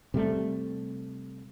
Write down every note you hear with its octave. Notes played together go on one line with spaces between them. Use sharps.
C3 G3 A3